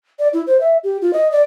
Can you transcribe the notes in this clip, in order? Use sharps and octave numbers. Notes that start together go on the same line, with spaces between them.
D5
E4
C5
E5
G4
F4
D#5
D5